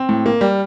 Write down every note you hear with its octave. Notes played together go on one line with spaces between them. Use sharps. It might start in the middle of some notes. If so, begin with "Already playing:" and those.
Already playing: C4
A2
A#3
G3